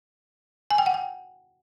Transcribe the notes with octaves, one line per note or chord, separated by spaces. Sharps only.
G#5
G5
F#5
G5